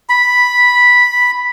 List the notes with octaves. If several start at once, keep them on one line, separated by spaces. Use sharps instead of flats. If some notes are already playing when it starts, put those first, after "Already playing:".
B5